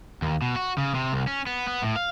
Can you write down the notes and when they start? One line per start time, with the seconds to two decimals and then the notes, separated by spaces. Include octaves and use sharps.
0.22 D#2
0.42 B2
0.56 F#4
0.78 C#3
0.95 C3
1.13 C2
1.27 C#4
1.47 B3
1.67 B3
1.83 A2
1.96 F5